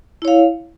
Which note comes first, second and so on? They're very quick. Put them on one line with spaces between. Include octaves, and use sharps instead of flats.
E4 C#5 F5